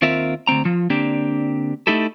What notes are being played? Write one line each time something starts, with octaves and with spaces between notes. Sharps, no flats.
D#2 C4 F4 A#4 E5
D2 G#2 C4 A#5
F3 F4
D3 A#3 C4 D4 G4
A3 D#4 E4 G4 A4